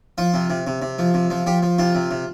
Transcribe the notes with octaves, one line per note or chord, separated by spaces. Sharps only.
F3 F4
C3
C3
C3
C3
F3
C3
F3
F3 G4
F3
C3 F4
C3
C3